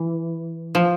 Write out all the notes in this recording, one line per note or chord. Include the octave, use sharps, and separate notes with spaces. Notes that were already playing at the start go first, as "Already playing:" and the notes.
Already playing: E3
F3